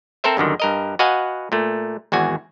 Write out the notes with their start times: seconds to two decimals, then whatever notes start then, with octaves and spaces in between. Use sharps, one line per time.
0.24 C4 A4 A#4 C5 E5
0.37 G1 F#2 D3 D#3
0.60 G2 A#4 D#5
0.99 F#4 B4 D#5 F5 F#5 G#5
1.52 A#2 A3
2.12 G#1 E2 F#4 G#5